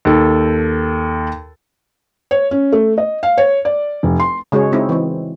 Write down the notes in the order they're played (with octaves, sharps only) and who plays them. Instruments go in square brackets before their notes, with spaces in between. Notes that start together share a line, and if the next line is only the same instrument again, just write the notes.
[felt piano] D#2 A4
C#5
C#4
A3
D#5
F5
C#5
D5
F1
C6
[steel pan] C#3 G#3 F#4 G#4 C#5
G#3 C4 D#4 E4
E3 C4